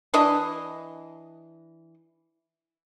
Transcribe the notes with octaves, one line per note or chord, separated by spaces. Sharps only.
E3 D4 E4 D#5